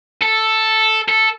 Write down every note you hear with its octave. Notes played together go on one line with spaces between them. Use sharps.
A4
A4